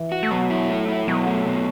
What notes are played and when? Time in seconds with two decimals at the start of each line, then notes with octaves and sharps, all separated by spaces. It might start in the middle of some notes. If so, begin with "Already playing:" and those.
Already playing: E3
0.12 F#4
0.23 A3
0.31 B2 F#3
0.50 E4
0.69 A3
0.88 E4
1.07 B2 F#3
1.27 A3
1.46 B2